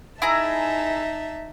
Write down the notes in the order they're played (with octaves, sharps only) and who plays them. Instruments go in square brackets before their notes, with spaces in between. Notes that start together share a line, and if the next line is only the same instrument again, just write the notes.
[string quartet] D#4 E5 A5 [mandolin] E4 G#4 A#5